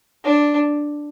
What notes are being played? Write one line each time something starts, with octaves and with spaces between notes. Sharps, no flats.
D4